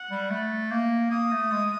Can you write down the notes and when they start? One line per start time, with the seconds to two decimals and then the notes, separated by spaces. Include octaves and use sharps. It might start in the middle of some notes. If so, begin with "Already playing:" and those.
Already playing: F#5
0.11 G3
0.31 A3
0.71 A#3
1.11 A#3 D#6
1.32 A3
1.52 G#3